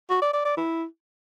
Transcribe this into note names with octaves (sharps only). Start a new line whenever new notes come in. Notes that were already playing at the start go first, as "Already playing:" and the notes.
F#4
D5
D5
D5
E4